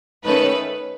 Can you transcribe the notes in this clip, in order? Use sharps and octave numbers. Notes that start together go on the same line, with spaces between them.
D#3 A3 C#4 B4